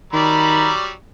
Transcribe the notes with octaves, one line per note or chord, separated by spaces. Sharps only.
D#3 F#3 G3 D5 A#5 B5